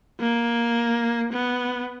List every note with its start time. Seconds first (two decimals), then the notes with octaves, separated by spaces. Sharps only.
0.20 A#3
1.32 B3